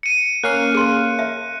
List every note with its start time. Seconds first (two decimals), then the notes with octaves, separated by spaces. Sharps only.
0.03 C#7 D#7
0.44 A#3 C#4 F5 F#6
0.75 G#4 C6
1.19 E5